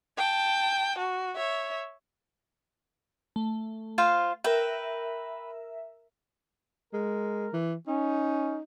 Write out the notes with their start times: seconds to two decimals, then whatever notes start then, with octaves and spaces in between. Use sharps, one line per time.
0.18 G5 A5
0.98 F#4
1.35 C#5 E5
3.36 A3
3.98 F4 C5 F5
4.44 A#4 B4 E5 G5
6.93 G#3 A#4
7.53 E3
7.87 C#4 D#4